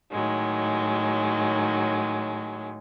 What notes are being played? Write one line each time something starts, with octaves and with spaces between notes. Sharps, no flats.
A2 D#3 F#3 G#3